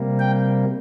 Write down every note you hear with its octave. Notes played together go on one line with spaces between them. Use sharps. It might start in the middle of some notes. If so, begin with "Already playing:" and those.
Already playing: C3 G3 A#3
G5